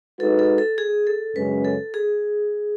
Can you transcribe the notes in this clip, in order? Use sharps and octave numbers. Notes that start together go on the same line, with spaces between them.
G#3 D#4 F#4 A4 B4
A4
A4
G#4
A4
F#2 C#3 G#3 C#4 B4
A4
G#4